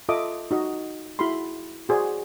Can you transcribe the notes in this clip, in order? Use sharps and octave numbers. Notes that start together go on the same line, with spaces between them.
F4 A4 D#5 E5 D6 D#6
D#4 F#4 D#5
E4 F#4 G#4 B5 C6
F#4 G#4 C5 D5